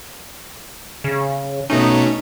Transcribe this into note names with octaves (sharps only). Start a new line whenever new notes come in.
C#3
B2 A3 C#4 D#4